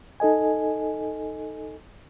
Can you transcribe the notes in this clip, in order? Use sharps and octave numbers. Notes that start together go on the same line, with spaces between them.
D#4 A4 D#5 G#5